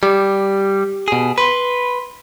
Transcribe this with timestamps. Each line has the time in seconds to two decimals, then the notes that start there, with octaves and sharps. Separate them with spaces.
0.03 G3 G4
1.08 B2 G#4
1.38 B4 B5 C6